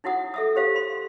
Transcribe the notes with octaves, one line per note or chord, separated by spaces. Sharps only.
D#4 E4 F#4 F#5 D#6
A4 E5 D#6
G4 C5 F5
C6